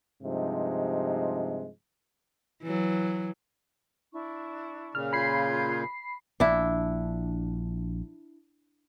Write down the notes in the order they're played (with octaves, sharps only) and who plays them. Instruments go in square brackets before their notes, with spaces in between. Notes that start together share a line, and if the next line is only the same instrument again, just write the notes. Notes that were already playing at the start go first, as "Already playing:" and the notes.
[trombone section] G2 C3 F3 G#3 D#4
[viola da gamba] E3 F#3
[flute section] D4 E4 C#6
[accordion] A#2 C#3 [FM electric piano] F6
[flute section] F4 G6 G#6 [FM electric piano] B5 C7
[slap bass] A#1 [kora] D4 E4